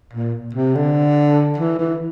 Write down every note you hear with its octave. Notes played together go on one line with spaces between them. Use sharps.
A#2
C3
D3
E3
E3